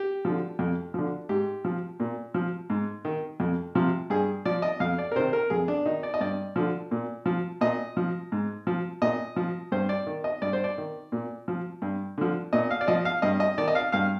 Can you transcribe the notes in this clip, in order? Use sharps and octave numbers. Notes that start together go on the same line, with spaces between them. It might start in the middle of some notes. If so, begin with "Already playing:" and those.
Already playing: G4
D3 F3
F2
D3 F3
G#2 G4
F3
A#2
F3
G#2
D#3
F2
C3 F3
G2 G#4
F3 D5
D#5
F2 F5
D5
A#4
C3 D#3 C5
A#4
F2 G#4
D4
D#3 D#4
D5
D#5
G2 D5
D3 F3
A#2
F3
A#2 D#5
F3
G#2
F3
A#2 D#5
F3
G2 C5
D5
D#3
D#5
G2 D5
C5
D5
D#3
A#2
F3
G2
D3 F3
A#2 D#5
F5
D5
F3 D#5
F5
G2 D#5
D#5
D#3 D5
D#5
F5
G2 F5